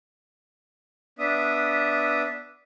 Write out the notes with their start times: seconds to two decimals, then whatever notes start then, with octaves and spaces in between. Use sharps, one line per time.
1.19 B3 D4 E5 D#6